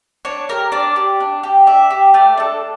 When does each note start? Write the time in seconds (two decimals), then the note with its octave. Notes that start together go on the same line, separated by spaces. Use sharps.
0.25 D4 C#5
0.49 G4 A#4
0.72 D4 D5
0.96 G4
1.20 D4
1.43 G4
1.67 D4 E5
1.90 G4
2.14 A3 D5
2.37 D4 A4